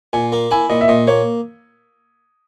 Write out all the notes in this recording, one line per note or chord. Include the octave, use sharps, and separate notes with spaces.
A#2 G#5
A#3
E4 G#5
A#2 D#5
E5
A#2 D#5
A#3 C#5